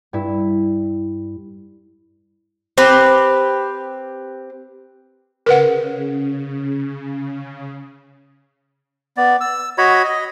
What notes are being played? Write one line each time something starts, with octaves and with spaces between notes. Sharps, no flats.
G2 E4
C4 G4 B4
C#3 A#4 B4 F#5
B3 D5
E6
F#4 C#5 D#5 B5
D#5